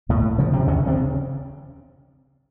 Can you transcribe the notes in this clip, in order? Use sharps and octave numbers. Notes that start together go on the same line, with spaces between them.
D#2 A2 A3
C#3 F3
C3 C4
D#2 C#3 C#4
C3 C4
C#3